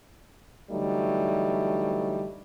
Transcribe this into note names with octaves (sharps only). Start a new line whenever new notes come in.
D3 E3 F#3 G3 A3 D#4